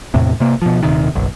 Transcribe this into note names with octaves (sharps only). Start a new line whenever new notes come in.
E2 A2 C3
C3 A#3
B2 F3
D#1 C3 D#3
F#1 B1